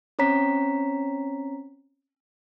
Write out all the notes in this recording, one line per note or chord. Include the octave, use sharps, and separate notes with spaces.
C4 C#4 C#5 A#5 B6